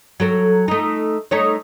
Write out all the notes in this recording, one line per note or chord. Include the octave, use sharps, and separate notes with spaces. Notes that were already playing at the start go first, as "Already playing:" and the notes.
F#3 A4 A#4
A3 D#4
A3 D#4 C#5